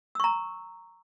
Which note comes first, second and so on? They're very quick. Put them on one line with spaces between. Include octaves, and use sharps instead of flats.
E6 C#6 A#5